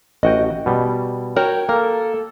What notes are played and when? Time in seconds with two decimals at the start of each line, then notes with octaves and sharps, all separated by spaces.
0.23 A1 F#4 D#5 G5
0.66 B2 G3
1.36 F#4 A#4 C#5 G5
1.69 A#3 A4 A#4